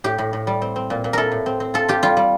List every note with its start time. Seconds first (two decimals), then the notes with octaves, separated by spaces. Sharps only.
0.04 A2 G4
0.18 A2
0.33 A2
0.47 G3
0.62 C4
0.76 C4
0.90 A#2
1.04 A#2
1.13 E4 A4 A#4
1.32 A2
1.46 C4
1.60 C4
1.74 F4 A4
1.88 F4 G4
2.03 G3 F4
2.17 G3